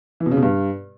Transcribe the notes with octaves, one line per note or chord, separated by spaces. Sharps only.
E3
B2
C#3
B2
G2